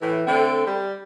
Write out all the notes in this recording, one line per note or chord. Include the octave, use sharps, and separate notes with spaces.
A2 E3
D3 A3 C4
G3